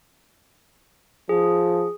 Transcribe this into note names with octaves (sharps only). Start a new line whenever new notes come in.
F3 G#4